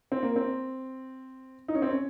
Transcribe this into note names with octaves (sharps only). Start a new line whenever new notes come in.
C4
A#3
C4
D#4
C#4
C4
C#4